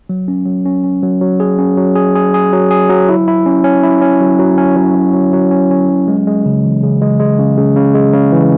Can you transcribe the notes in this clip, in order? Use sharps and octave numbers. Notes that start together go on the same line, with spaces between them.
F#3
C#4
F#3
C#4
C#4
F#3
F#3
G#4
C#4
F#3
G#4
G#4
G#4
F#3
G#4
F#3
E4
E4
C#4
C#4
E4
C#4
F#3
F#3
C#4
F#3
F#3
F#3
F#3
C#4
C#4
F#3
G#3
G#3
C#3
E3
C#3
G#3
G#3
C#3
C#3
C#3
G#3
C#3
E3